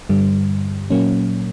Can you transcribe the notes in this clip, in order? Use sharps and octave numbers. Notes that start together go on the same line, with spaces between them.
G2 D3 G3
A#2 F#3 A#3 C#4